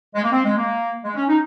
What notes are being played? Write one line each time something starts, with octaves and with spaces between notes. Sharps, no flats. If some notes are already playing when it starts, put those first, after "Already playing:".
G#3
A#3
C4
G#3
A#3
G#3
C#4
D#4